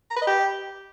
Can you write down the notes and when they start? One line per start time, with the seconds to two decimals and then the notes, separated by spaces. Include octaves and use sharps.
0.11 A#5
0.16 B4
0.22 D#5
0.27 G4